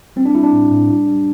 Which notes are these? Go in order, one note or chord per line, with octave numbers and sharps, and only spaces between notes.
G3 C4
D4
G3 E4
D4
A2
A2
G3
G3